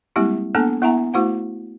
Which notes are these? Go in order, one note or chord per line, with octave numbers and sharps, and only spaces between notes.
G3 G#3 A#3 C4 E4 G4
A#3 B3 D4 A4 G#5 A5
B3 E4 E5 F#5 G#5 A#5
A3 E4 F#4 C5 F#5